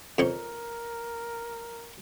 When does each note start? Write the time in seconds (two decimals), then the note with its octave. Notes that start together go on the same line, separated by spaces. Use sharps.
0.18 F2 C4 A#4 C#5